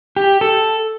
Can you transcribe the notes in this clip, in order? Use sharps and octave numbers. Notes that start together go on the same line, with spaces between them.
G4
A4